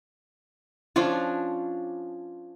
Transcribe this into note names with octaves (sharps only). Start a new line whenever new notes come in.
F3 C#4 D4 F4